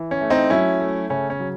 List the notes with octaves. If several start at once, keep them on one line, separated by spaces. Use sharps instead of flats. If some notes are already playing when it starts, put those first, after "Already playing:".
Already playing: E3
C#4
A3
C4 D#4
F#3 C#4 E4
A3
C#3 C#4
C#4
F#3